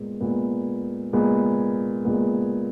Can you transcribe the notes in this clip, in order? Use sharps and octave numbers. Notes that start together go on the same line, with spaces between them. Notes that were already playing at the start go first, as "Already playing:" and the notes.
Already playing: A#2 G#3 B3
A#2 G#3 B3
A#2 G#3 B3
A#2 G#3 B3